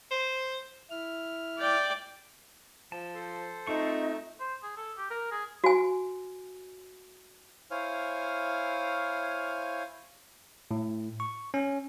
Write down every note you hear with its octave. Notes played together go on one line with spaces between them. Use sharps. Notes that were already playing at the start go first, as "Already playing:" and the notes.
C5
E4 F6
D5 G5
F3 A5
A4 C5
A3 C4 D#4 F4 C#6
C5
G#4
A4
G4
A#4
G#4
F#4 G#5
E4 C5 C#5 F5 G#5 F6
A2
C#6
C#4